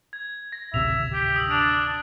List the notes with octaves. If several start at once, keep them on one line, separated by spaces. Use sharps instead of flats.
G#6
A#6
D1 G#1 C3 E5 F7
G4
D#6 E6 F#7
D4 D#6 D7 F7